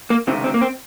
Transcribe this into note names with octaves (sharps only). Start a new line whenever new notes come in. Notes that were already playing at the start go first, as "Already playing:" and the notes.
A#3
C#2 C3 D#3 C4
C4
A#3
C4